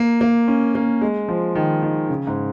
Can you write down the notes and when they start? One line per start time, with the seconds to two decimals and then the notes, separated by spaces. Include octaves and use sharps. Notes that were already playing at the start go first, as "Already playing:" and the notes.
Already playing: A#3
0.21 A#3
0.48 C#4
0.75 A#3
1.01 G#3
1.28 F3
1.55 D#3
1.83 D#3
2.09 C#3
2.27 G#2